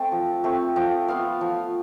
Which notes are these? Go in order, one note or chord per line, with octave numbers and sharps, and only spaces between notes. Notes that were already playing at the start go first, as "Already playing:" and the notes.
Already playing: A3 C4 F5 G5 A5
F3
A3 C4
F3 G5
B3 F4 F5
F3